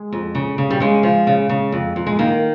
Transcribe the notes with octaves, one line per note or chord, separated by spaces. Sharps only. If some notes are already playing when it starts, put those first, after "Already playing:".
Already playing: G#3
F2
C#3
C#3
G3
C#3 G#3
F3
C#3
C#3
F2
F2
G#3
D#3 A#3